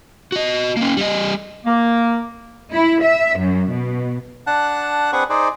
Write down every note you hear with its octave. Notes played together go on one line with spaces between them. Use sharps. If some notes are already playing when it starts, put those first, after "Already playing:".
F#4 D#5
A#3 C#4
G3 D#5
A#3
E4
E5
F#2
B2
D4 F#5 A5 F#6
C4 D4 G#4 B4 F#5 C#6
D#4 G#4 C5 D5